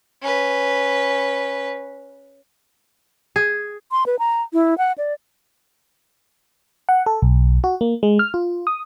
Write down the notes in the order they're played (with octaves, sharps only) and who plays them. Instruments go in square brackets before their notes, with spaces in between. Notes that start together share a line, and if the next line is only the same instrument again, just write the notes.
[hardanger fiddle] C#4 B4
[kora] G#4
[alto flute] C6
B4
A#5
E4
F#5
D5
[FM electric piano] F#5
A4
B1
F#4
A#3
G#3
F6
F4
D#6